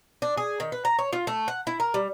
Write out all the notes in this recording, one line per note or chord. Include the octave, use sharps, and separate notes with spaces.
D4
G#4
D#3
B4
A#5
C#5
F4
A3
F#5
E4
A#4
G3